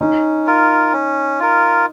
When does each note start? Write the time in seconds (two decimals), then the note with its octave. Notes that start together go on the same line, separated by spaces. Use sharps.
0.01 C#4 D#4
0.47 F4 A#4
0.93 C#4
1.40 F4 A#4